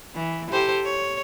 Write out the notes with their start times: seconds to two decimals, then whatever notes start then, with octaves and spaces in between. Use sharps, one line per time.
0.15 E3
0.51 G4 A4 C5
0.85 C#5